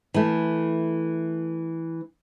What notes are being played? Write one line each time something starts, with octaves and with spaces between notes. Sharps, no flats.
E3 A3